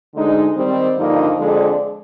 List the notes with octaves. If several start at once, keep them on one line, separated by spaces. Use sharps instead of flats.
D2 D3 G#3 D#4
D#3 G3 C4
G2 D3 F3 A#3 D#4
F2 D3 G#3 D4 G#4